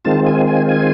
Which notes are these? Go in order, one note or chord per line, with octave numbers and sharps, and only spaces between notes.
D#3 G#3 C4 F4 A5
G#5
G#5
G#5